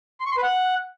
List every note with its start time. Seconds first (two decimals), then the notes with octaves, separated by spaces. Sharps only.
0.20 C6
0.26 C#6
0.32 C6
0.37 B4
0.43 F#5